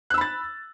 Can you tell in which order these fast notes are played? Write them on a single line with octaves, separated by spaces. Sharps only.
F#6 E6 B5 A6